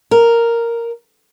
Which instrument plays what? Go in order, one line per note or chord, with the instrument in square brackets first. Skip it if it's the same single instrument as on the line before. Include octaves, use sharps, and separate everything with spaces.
[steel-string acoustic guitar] A#4